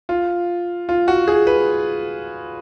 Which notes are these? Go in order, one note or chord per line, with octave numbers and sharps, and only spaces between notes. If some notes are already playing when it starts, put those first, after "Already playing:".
F4
F4
F#4
G#4
B4